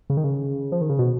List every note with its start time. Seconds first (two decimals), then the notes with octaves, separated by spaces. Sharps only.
0.10 C#3
0.17 D#3
0.24 C#3
0.72 F3
0.81 D#3
0.89 C#3
0.99 B2